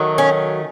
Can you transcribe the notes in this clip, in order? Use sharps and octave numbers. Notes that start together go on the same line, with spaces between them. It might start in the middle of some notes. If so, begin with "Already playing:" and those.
Already playing: D#3 F#3 A3
C#4